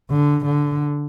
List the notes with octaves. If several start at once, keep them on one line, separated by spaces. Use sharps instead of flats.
D3
D3